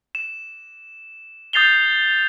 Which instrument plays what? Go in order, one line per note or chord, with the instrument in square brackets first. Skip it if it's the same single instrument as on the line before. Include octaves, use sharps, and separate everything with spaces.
[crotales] E7
D#6 G6 A6 C7 F7 G7